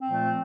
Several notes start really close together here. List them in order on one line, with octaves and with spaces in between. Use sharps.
C4 A#2 F3 A3